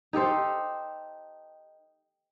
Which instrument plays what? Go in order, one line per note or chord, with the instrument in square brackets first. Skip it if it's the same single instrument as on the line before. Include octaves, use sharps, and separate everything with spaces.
[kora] D#4 G4 A4 C5